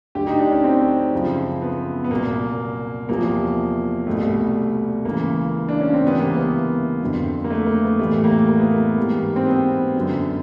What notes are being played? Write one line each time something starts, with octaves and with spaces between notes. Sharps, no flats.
D2 D3 F#3 G4
D#4
D4
C#4
C4
F#2 C#3 F3
B3
B3
C2 A#2 F#3 A#3
E2 C3 F3 A#3
C2 B2 G3 A3
C#2 C#3 E3 A#3
D4
C#4
C4
C#2 C3 E3 B3
A#3
B3
F2 D3 F#3
A#3
A3
A#3
B3
A2 E3 G3 A3
A#3
A#3
B3
A#3
G#2 E3 G3
C4
B3
F#2 D3 F#3